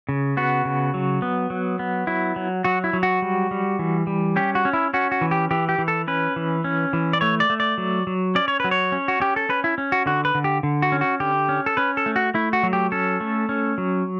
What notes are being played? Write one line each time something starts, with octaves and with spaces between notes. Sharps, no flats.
C#3
B3 F#4
C#3
F#3
B3
F#3
B3
F#3 E4
F#3
F#3 F#4
E4
F#3
F#4
G3
G3
E3
G3
C#4 G4
F#4
C#4
E4
C#4 F#4
F#4
E3
G4
E3 G4
G4
E3
A4
C#4 B4
E3
C#4
E3
D5
A3 C#5
D5
A3
D5
F#3
F#3
C#4 D5
C#5
F#3 B4
C#5
C#4
F#4
C#4 G4
A4
C#4 B4
E4
C#4
F#4
D3 F#4
B4
D3
G4
D3
F#4
C#4
F#4
D3 G4
C#4
A4
C#4 B4
A4
A3
F#4
A3 E4
F#4
F#3
G4
C#4 A4
A3
C#4
F#3